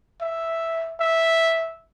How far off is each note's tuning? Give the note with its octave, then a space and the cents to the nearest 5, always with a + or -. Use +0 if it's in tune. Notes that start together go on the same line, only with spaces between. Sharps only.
E5 +0
E5 -5